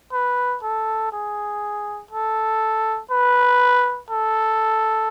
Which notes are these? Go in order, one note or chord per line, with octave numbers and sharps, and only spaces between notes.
B4
A4
G#4
A4
B4
A4